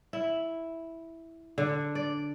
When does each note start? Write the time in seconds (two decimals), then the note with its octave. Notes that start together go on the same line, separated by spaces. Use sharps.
0.13 E4
1.58 D3
1.95 D5